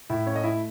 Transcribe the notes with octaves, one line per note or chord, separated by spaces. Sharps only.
A2 E4 E5
C#4 C#5
A3 D#5
E4 E5